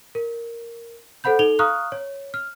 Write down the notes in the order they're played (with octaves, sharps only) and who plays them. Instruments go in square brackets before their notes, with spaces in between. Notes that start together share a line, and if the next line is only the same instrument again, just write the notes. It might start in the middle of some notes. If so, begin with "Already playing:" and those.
[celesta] A#4
A4 C5 F#5 B5 G6
D#4 A4 F7 G7
F5 A#5 C#6 D#6 F6 F#6
C#5
F6